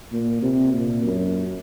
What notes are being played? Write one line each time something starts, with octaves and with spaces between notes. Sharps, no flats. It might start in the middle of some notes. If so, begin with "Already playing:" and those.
A#2
C3
A#2
F#2